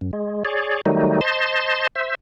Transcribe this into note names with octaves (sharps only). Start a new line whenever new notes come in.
F#2
G#3
G#4 C#5 D5
D#3 F#3 G3 A3 D#4
C5 D#5 A5 C6
C5 E5